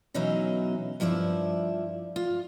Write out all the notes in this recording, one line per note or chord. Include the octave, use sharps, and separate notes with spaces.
B2 E3 F#3 C#4 D#4 E5
G2 F3 E4 D5 E5
F4